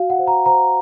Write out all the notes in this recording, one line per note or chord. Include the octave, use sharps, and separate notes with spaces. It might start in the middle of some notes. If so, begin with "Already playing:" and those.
Already playing: F#4 F5
F#5
C5
A#5
C5 A#5